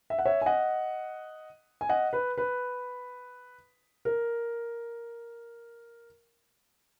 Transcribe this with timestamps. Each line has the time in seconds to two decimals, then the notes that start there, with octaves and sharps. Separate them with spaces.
0.10 E5
0.18 F#5
0.25 C#5 E5
0.42 G#5
0.46 D#5 F#5
1.81 G#5
1.89 D#5 F#5
2.13 B4
2.38 B4
4.05 A#4